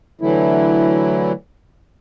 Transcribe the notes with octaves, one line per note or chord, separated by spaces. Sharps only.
D3 E3 F#3 A3 E4